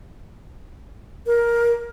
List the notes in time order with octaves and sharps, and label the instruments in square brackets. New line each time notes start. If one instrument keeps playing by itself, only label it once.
[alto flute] A#4